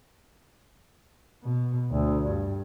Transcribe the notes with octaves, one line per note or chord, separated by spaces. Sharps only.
B2
D2
G2